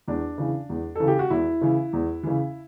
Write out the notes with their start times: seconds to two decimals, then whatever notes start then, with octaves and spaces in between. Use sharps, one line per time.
0.08 E2 D4
0.38 C#3 E3
0.70 E2
0.95 C#3 E3 A4
1.07 G4
1.19 F#4
1.30 E2 E4
1.61 C#3 E3
1.93 E2
2.23 C#3 E3